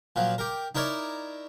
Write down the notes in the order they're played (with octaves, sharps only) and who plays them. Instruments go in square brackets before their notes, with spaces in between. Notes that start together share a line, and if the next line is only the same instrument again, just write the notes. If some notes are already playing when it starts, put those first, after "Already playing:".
[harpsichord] A#2 F3 F#3
G4 A#4
D#4 E4 A#4 C#5 D5